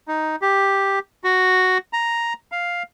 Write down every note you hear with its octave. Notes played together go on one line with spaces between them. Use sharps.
D#4
G4
F#4
A#5
F5